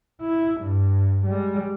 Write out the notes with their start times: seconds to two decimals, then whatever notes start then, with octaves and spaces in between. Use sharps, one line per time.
0.21 E4
0.61 G2
1.26 G3 G#3